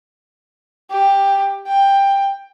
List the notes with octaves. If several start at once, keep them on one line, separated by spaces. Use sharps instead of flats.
G4
G5